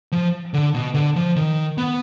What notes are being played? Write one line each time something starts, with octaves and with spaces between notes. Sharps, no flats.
F3
D3
B2
D3
F3
D#3
B3